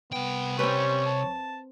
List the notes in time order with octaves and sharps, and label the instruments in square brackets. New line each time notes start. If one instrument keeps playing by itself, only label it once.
[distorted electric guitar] C2 G5 [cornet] B3
[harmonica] G3 C#4 C#6 [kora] C4 B4 [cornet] C#5
[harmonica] A5